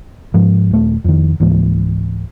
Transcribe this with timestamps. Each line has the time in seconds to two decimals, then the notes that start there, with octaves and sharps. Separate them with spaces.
0.34 G#2 F3
0.71 D#1 A3
1.04 F2 D#3
1.40 C#2 G#2 E3 A#3